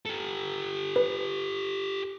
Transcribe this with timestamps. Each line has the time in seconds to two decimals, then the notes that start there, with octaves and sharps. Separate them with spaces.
0.06 G4 A4
0.96 B4